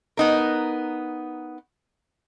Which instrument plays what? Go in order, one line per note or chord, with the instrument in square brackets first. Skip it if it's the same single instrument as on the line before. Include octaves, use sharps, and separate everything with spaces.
[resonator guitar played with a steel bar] B3 D#4 A#4